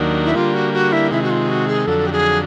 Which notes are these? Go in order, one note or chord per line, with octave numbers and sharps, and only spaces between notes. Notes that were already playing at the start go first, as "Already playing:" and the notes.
Already playing: D#2 D#3 F#3 A#3 D4
E4
D3 G3 A#3 F4
F#4
F#4
E4
C3 D#3 G#3 E4
F#4
F4
F#4
G#4
F2 D3 F#3 A4
G4
G#4